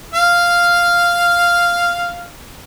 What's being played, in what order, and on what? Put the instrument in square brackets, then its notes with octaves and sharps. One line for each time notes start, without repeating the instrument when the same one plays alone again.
[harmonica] F5 F6